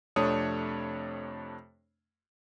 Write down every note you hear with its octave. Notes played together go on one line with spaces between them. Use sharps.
F2 C3 A3 D4 C#5 D#6